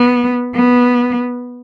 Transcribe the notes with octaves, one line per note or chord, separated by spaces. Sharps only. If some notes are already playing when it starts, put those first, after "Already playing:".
Already playing: B3
B3